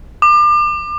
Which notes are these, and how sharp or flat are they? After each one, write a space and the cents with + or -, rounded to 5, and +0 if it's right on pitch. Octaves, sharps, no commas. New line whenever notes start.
D6 +35